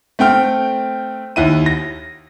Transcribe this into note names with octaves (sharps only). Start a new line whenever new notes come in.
A3 C4 G5 F6
D#2 E4 D#7
A#6